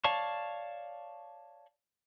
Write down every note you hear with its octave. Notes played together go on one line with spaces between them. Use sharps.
C#5 D5 F5 A5 C#6